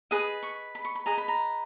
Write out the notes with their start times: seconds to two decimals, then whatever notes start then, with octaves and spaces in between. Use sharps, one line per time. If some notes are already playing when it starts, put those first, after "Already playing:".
0.11 G#4 B4 D#5 D#6
0.43 C#6
0.75 B5
0.85 C#6
0.95 B5
1.06 G#4 B4 D#5 A#5
1.18 B5
1.28 A#5